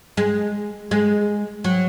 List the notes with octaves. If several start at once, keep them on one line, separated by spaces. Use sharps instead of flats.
G#3
G#3
F#3